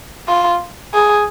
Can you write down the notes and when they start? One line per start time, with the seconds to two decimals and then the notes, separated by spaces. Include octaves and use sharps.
0.28 F4
0.94 G#4